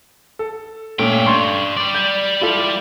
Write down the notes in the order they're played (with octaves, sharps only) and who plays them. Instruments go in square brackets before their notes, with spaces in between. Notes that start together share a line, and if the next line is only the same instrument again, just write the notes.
[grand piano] A4
[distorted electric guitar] G2 G5 [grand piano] A#2 A3 C#4
[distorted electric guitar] G2 [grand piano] C6 C#6
[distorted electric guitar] G3 D5
[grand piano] G6
E4 F4 A4